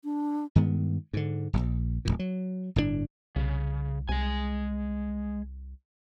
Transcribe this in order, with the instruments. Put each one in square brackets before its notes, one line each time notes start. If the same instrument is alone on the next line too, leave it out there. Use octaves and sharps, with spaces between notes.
[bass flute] D4
[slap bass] G2 D#3 G#3 B3
G#2 D3
D1 A#1
D1 C#2 A#2
F#3
G1 A2 C#3 D4
[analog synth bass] C2 [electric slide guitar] C#3
[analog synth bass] C2 [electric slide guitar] G#3 G#5